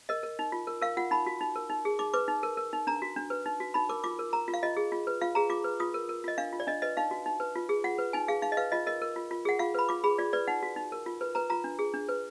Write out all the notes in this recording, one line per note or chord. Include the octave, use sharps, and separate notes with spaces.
A#4 D#5
A#4
D#4
F4
A#4
A#4 F5
F4 F#5
D#4 B5
F#4
D#4
A#4
D#4
G#4
D#4 D6
B4 D6
D#4
A#4
A#4
D#4
D4 A#5
F#4
D4
B4
D#4
F#4
D#4 B5
A#4 D6
F4 D6
A#4
A#4 A#5
F4
F5
F4 D#5
G#4
F4
B4
F4 F5
G#4 A#5
F4 D6
B4
F4 D#6
A#4
A#4
F4 D#5
D4 F5
F4
D5
D4 D#5
B4 D#5
D#4 F5
F#4
D#4
B4
F4
G#4
F4 F#5
B4
D#4 G#5
G#4 F5
D#4 F5
D#5
B4 F5
F4 D#5
A#4 D#5
A#4
F4
F4
G#4 F#5
F4 F5
B4 B5
F4 D6
G#4 B5
F4 D5
B4 D5
D#4 F#5
F#4
D#4
A#4
F4
B4
B4 A#5
F4 A#5
D4
G#4
D4
B4